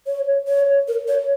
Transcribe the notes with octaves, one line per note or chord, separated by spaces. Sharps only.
C#5
C#5
A#4
C#5